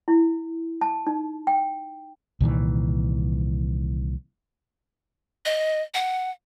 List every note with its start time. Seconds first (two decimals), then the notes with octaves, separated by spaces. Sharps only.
0.08 E4
0.81 A5
1.07 D#4
1.47 G5
2.41 C2 A#2 D#3 E3
5.45 D#5
5.94 F#5